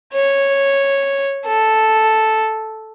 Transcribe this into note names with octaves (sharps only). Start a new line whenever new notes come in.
C#5
A4